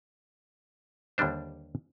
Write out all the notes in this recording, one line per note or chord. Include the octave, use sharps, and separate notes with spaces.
D#2 D3 G3 D4 C5